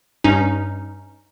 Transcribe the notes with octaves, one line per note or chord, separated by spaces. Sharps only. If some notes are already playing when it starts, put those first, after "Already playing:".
G2 C#4 D#4